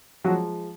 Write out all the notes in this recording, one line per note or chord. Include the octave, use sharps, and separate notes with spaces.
F3 F#3 G#3 F#4